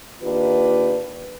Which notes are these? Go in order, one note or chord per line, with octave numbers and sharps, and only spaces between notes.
D#3 A#3 D4 F4 G4 B4